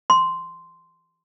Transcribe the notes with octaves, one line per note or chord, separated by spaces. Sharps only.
C6